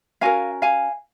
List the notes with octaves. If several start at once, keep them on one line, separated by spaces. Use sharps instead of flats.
C#4 F#4 A#4 F5 G#5
F5 G#5